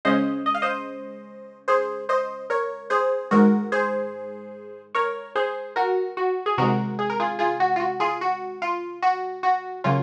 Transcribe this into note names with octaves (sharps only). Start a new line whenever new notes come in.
C#3 G#3 C#4 C5 D#5
D#5
F5
C5 D#5
G#4 C5
C5 D#5
A#4 C#5
G#4 C5
G#2 D#3 G#3 F#4 A#4
G#4 C5
A#4 C#5
G#4 C5
F#4 A#4
F#4
G#4
C3 D#3 G#3 F#4 A#4
G#4
A#4
F4 G#4
F4 G#4
F#4
F4
F#4
F4 G#4
F#4
F4
F#4
F#4
C#3 F#3 A#3 C#4 F4